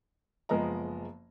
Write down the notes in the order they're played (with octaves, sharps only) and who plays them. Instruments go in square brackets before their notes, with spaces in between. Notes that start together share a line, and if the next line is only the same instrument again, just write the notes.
[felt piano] F#1 F3 G#3 B3 D#5 A#5